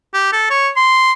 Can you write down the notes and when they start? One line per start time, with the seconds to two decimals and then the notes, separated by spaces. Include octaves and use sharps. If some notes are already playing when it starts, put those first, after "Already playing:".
0.14 G4
0.33 A4
0.50 C#5
0.76 C6